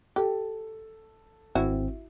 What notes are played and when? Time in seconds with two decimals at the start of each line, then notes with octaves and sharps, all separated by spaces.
0.16 G4 A4
1.55 G#1 C4 E4 F#4